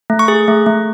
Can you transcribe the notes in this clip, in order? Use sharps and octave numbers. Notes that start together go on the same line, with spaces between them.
A3
C#6
G#4
A3
A3